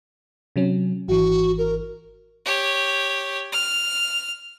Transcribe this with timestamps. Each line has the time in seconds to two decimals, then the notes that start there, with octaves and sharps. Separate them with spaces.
0.56 C3 F#3 C#4
1.08 G#1 E3 F#4
1.58 A#4
2.46 G4 C#5
3.52 F6